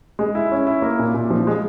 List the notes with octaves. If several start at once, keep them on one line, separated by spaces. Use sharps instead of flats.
G#3
E4
C#4
E4
A#3
A#2
A#2
F3
G#3